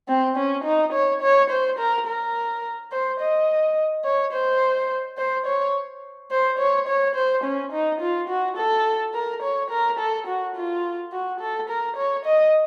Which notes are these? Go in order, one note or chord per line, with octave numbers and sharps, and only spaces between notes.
C4
C#4
D#4
C#5
C#5
C5
A#4
A#4
C5
D#5
C#5
C5
C5
C#5
C5
C#5
C#5
C5
C#4
D#4
F4
F#4
A4
A#4
C#5
A#4
A4
F#4
F4
F#4
A4
A#4
C#5
D#5